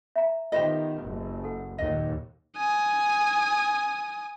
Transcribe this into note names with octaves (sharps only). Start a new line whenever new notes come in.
E5 A#5
D#3 B3 F4 G4 C5 D#5
F#1
A4 F#5
D#2 A#2 D#5
G#5 D#6